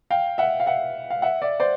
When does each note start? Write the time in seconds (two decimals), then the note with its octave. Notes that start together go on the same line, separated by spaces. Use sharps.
0.10 F5 G5
0.38 E5 F#5
0.60 F5
0.66 E5 F#5
1.10 F5
1.22 E5 F#5
1.41 D5 E5
1.60 C5 D5